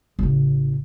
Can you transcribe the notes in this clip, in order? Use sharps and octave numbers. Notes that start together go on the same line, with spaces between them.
A1 C#3